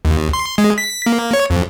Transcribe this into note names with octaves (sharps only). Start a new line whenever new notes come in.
D#2
C6
G#3
B6
A#3
C#5
F2